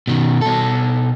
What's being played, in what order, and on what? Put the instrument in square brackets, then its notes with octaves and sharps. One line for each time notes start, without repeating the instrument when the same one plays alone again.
[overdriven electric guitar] B2 D#3
B2 A4